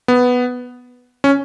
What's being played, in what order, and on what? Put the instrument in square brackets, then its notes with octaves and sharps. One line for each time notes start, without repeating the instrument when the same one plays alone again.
[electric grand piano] B3
C#4